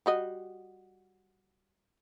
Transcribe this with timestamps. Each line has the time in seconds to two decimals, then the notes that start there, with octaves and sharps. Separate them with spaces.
0.06 G3 F#4 D#5